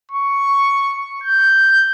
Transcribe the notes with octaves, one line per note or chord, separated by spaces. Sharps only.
C#6
G6